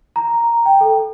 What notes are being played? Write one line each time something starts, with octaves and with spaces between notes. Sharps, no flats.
A#5
G5
A4